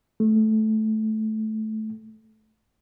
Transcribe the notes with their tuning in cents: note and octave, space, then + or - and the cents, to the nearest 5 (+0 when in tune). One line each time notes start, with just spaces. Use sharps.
A3 -15